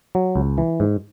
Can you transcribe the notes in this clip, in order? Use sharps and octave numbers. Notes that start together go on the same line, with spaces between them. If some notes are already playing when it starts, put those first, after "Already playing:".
F#3
C#2
E3
G#2